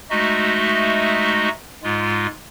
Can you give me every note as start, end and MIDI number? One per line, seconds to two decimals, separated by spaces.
0.10 1.49 56
0.10 1.49 57
0.10 1.49 63
0.10 1.49 66
0.10 1.49 75
0.10 1.49 76
1.83 2.27 44
1.83 2.27 56
1.83 2.27 65